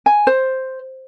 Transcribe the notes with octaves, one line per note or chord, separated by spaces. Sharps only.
G#5
C5